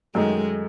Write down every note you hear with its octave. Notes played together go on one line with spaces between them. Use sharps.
F#2 D#3 G#3 A3 D#4